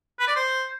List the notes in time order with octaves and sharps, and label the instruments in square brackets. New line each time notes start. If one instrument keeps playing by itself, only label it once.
[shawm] B4
D5
C5